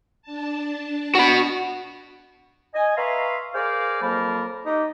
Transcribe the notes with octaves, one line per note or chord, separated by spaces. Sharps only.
D4 A5
F#4 F#5 B5
D#5 G#5
B4 E5 F5 A#5 C6 C#6
G#4 A#4 C5 D5 F5
F2 F#3 A#3 A#4 A5 B5
D#4 G4 D#5